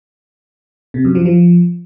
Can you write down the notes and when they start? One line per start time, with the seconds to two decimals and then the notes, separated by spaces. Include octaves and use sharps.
0.94 C3
1.05 F#2
1.15 F3
1.26 F3